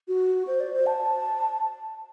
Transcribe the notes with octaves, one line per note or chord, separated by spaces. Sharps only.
F#4
C5
D5
C5
A5